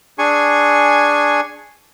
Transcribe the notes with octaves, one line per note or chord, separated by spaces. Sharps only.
D4 G#4 G#5 C#6